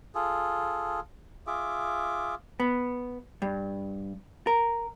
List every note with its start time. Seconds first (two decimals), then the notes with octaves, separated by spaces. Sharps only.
0.15 F4 G#4 A4
1.47 F4 G#4 E5 D6
2.60 B3
3.42 G2
4.47 A#4